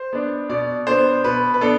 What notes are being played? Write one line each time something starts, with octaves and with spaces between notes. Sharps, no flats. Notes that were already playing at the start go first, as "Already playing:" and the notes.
Already playing: C5
B3 D4
B2 D5
B3 D4 C5
B2 B4
B4
B3 D4 A4